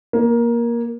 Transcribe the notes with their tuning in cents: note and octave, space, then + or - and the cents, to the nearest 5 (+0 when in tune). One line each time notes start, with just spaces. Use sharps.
A#3 +15